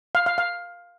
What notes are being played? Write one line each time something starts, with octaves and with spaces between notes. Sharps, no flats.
F5
F5
F5